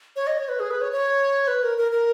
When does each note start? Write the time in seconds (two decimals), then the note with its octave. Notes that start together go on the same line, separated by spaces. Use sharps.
0.16 C#5
0.27 D#5
0.38 C#5
0.49 B4
0.60 G#4
0.71 B4
0.81 C#5
0.92 C#5
1.47 B4
1.63 A#4
1.78 A#4
1.92 A#4